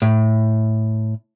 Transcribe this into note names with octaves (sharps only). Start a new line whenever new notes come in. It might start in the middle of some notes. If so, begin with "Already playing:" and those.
A2